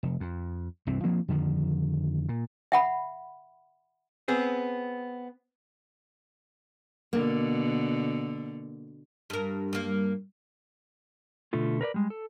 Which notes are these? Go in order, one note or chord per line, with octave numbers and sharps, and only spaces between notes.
F1
F2
C2 G2 E3 C4
F3 A#3 C4
F2 D3 D#3 F3
A#2
E5 F#5 B5
B3 C4 G#4
B2 D3 A#3
G2 A#4
G2 A#3
B2 D3 A3 F4
A#4 B4 C#5 D5
G3 G#3
A4